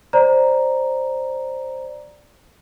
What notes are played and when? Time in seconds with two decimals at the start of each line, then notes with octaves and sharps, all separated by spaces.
0.13 C5 D5 A#5